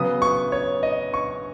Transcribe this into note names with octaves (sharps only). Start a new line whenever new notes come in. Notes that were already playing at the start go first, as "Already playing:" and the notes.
Already playing: C#3 F#3 B3 D#6
C#6
C#5
D#5
C#6